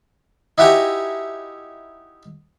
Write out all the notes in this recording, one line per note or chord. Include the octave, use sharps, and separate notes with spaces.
D#4 E4 F#4 G4 G#5 A#5